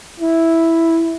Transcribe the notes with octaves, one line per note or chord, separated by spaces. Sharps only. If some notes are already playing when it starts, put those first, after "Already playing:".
E4